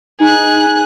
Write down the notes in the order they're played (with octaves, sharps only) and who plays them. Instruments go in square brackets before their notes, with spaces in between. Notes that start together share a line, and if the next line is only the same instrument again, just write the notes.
[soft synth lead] D#4 [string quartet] G#4 F#6